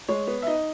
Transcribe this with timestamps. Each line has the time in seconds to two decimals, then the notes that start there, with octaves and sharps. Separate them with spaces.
0.08 G#3 C#5
0.27 B3
0.42 E5
0.47 D#4 D#5